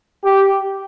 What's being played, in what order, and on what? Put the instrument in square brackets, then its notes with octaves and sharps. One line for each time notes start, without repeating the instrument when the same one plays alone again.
[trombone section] G4